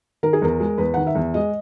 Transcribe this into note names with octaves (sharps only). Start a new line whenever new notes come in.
D#3 A#4
G#4
E2 A#4
G#3
E2 B4
D#3 F#5
E5
E2
G#3 D#5